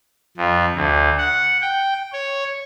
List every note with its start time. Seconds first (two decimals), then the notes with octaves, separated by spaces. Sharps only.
0.37 F2
0.76 D2
1.18 F#5
1.61 G5
2.13 C#5